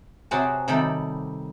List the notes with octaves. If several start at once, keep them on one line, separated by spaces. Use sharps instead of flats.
C3 F#3 C4 F#4 G#4 A5
C3 D#3 G3 D#4 A4 B5